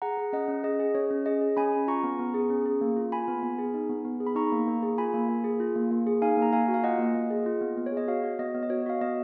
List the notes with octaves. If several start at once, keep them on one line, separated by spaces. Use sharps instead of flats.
G#4 F#5 A#5
G#4
C#4 D#5 F#5
C#4
G#4 D#5
G#4
C#4 C#5
C#4
G#4 D#5
G#4
C#4 G#5 B5
C#4
F4 A#5 C#6
B3
B3
G#4
C#4
G#4
A#3
F4
F4 G#5 B5
B3
B3
G#4
D#4
B3
B3
G#4
B5
D#4 A#5 C#6
A#3
A#3
G#4
F4 G#5 B5
A#3
A#3
G#4
F4
A#3
A#3
G#4
D#4 F5 G#5
A#3 A#5
A#3 F5 G#5
F#4
F5
F4 D#5 F#5
A#3
A#3
G#4
F4
B3
B3
C#5
G#4 D#5
F#4 C#5 F5
F#4
B3 D#5
B3
D#5
F#4 C#5
F#4 F5
B3 D#5